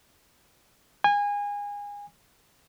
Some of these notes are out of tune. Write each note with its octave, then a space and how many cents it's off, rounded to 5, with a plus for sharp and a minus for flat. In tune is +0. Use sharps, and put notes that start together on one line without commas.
G#5 -25